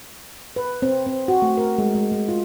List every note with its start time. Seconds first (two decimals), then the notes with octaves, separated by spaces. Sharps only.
0.56 B4
0.82 C4
1.06 C4
1.28 F#4
1.42 A3
1.57 A#4
1.78 G#3
1.95 G#3
2.12 G#3
2.29 F4